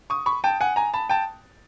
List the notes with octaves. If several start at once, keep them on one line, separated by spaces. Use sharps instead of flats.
C#6 D#6
B5 C#6
G5 A5
F#5 G#5
G#5 A#5
A5 B5
G5 A5